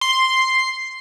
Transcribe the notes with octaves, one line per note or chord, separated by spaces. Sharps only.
C6